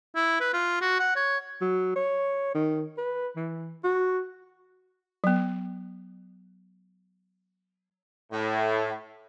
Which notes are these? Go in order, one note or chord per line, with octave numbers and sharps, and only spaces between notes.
E4
B4
F4
F#4
F#5
C#5
F#3
C#5
D#3
B4
E3
F#4
F#3 B3
A2